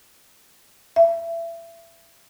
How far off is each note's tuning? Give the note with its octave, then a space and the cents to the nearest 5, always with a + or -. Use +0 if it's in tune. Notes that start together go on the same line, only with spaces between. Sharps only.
E5 +25